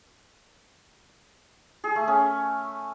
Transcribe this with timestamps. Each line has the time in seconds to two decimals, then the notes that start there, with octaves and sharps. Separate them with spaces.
1.84 G#4
1.96 A3
2.08 C#4